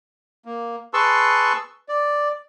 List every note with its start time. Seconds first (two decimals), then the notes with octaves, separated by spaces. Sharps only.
0.45 A#3
0.94 G#4 B4 A5 C6 C#6 E6
1.89 D5